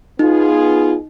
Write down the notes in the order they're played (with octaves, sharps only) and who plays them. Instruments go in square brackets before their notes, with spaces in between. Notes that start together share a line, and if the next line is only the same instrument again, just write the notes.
[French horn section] B3 F4 G#4 [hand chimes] D#4